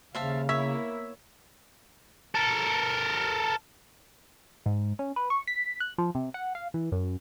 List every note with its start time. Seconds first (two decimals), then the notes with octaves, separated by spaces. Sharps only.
0.15 D#2 C#3 G3 C5 E5 F5 A5
0.49 A#3 B3 E4 C#5 E5
2.35 A4 A#4
4.66 G#2
4.99 C#4
5.16 B4
5.30 C#6
5.48 B6
5.80 F#6
5.98 F3
6.15 C3
6.34 F#5
6.55 F5
6.74 E3
6.92 F#2